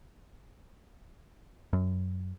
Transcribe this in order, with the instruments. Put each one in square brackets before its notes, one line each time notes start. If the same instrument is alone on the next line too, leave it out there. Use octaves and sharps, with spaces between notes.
[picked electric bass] F#2